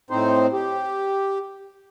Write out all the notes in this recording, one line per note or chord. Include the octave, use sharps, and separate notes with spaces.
A2 C4 D#4 C5
G4